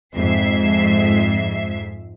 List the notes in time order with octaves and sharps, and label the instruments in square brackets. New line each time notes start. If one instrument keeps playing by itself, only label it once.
[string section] F2 G#2 E5 C7